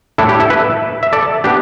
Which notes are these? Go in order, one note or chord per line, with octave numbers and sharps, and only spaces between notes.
A2 A3 D4 E4 A4
G4
E4 A4
B4 E5
E5
A4 D5
B3 D4 G4